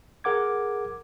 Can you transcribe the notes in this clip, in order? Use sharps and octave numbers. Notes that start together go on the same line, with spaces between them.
G#4 A#4 F#5 D6 G#6